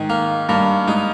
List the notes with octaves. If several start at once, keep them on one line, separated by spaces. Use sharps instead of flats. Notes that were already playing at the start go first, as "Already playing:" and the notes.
Already playing: G#2 D#3
A#3
G2 A#3
G#2 D#4